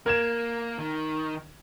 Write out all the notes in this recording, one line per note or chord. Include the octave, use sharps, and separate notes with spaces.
A#3 A#4 G#6 E7
D#3